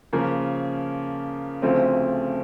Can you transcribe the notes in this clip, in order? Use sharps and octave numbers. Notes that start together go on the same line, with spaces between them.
C#3 F3 A#3
D2 C#3 F3 A3 C4